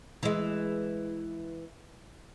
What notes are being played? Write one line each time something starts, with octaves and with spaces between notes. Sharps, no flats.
E3 G#3